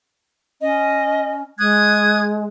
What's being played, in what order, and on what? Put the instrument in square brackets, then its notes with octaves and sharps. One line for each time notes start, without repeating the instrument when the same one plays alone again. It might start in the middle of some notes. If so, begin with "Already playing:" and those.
[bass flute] C#4 [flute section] D#5
[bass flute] G#3 [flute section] D#6 F#6 G#6